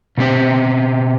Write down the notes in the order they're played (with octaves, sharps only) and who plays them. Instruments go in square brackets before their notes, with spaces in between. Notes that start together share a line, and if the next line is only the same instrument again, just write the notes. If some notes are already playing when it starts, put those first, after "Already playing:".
[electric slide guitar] B2 A3 C4 G4 C5